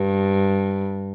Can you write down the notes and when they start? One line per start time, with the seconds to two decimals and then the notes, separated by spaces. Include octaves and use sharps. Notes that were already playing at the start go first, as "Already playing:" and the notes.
Already playing: G2